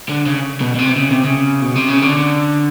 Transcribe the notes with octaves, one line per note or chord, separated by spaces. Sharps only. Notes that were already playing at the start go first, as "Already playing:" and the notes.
D3
C#3
B2
B2
C3
C#3
C3
C#3
B2
C3
C#3
D3